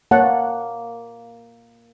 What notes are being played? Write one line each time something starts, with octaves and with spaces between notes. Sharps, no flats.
A#3 C#5 F#5 A5